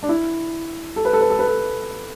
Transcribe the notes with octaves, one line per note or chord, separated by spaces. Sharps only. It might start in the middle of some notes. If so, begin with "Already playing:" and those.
D4
E4
A4
B4
A4
B4
A4
B4
A4